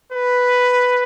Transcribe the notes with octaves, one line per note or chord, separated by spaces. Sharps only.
B4